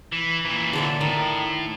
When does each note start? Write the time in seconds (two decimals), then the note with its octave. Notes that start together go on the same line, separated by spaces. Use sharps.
0.12 E3
0.45 A#2 E3
0.73 D3 A4 E5
1.01 A2 D#3